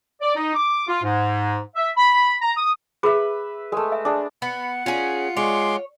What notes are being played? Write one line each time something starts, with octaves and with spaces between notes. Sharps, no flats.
D5
D#4
D6
F4
G#2
E5
B5
A#5
D#6
G#4 B4 E5
G#3 A3 A#4
E5
D4 G#4
B3 F#5 B5
C#4 F4 G#4
G#3 C#5 C6 D6